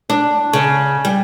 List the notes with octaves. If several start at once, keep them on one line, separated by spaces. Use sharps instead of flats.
D4
C#3
G3